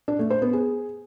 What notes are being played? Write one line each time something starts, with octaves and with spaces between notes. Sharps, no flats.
D4
A3
C5
B3
G#4